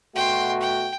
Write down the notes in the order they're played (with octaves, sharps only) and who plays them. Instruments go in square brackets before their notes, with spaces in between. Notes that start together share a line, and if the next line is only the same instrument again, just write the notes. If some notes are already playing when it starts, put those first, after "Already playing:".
[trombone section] B2 A3 F#4 [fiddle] G5 C6
[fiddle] G5